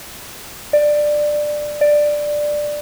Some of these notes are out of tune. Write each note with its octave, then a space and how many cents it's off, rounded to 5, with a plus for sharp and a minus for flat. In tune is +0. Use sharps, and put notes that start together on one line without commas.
D5 +15
D5 +10